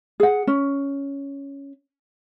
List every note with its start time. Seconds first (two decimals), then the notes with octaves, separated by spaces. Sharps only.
0.20 G#4 F#5
0.47 C#4